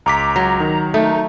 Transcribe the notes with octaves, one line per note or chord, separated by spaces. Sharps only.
C#2 A#5 D6 B6
F#3
D#3
A3 D#4